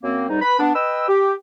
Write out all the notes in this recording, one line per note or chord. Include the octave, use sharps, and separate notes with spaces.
F#2 A#3 C4
C2 G#2 G3 D#4
B4 B5
B3 D4
B4 D#5 G5 E6
G4